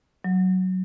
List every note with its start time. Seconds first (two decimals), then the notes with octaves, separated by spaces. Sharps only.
0.24 F#3